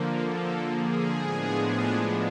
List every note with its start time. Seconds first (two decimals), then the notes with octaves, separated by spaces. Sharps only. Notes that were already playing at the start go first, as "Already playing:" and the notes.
Already playing: D3 F3 A#3
0.15 A4
0.65 G#4
1.13 A2 F3 G#3 B3 D4